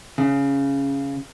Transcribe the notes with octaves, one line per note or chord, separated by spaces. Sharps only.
C#3